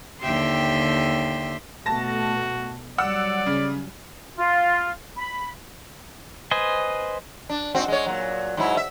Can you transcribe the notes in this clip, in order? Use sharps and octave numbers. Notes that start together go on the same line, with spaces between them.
D#2 D3 G4 E5 G5 C6
B2 A3 F#4 A5 A#6
F#3 G3 D5 F#5 E6
C#3
F4
B5
B4 C5 D#5 G#5
D4
G#2 C4 F#4
G#3 C#5
A#2 F#3
G#2 F#3 E4
E5